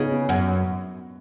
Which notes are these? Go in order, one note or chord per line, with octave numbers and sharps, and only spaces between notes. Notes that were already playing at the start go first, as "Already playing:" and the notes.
Already playing: C#3 B3 C#4 D#4 F4 B4
B3
F#2 B3